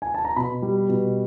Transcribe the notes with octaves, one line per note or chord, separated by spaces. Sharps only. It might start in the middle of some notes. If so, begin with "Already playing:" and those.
G#5
A5
A#5
B2 B5
G3
B2